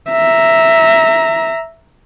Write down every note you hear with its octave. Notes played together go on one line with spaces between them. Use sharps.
E5 A#5